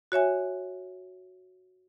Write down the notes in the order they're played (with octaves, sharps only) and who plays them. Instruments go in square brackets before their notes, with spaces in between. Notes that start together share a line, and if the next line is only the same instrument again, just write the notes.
[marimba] F#4 C#5 E5 G#5